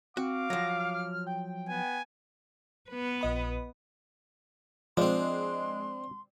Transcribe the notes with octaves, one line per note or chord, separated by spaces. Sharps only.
C4 F#4 F5 D6
F3 F#3 A#6
F6
G5
B3 G#5
B3 B4
A#1 D#5 B5
F3 G#3 C4 D4 C6